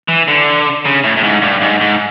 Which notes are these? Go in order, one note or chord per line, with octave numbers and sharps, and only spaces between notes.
E3
D3
C#3
A2
A2
G#2
G2
G#2
G#2